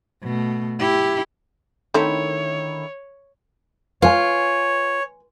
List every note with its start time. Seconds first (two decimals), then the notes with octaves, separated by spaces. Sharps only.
0.23 B2 A3
0.79 E4 G4
1.94 D3 D#3 A3 C4 D#4 E4 C#5
4.02 F4 B4 C#5 G#5